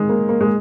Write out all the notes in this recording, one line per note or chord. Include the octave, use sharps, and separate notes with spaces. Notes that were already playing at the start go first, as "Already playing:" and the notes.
Already playing: D#3 G#3
A#3
A#3
G#3